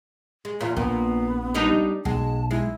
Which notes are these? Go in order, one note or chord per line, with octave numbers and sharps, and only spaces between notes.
G#3
E2 A#2 F4
A#1 A#2 B3
G3 D4 D#4
B1 G#3 A5
G#3 E4